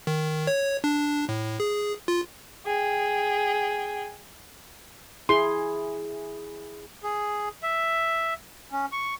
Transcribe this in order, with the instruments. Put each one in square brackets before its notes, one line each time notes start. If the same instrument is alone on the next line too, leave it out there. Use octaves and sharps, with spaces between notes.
[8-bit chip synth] D#3
C#5
D4
A2
G#4
F4
[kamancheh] G#4 G5
[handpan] E4 G#4 [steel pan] C6
[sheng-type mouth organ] G#4
E5
C#4
C#6